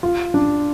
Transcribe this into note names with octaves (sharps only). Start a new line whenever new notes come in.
F4
D4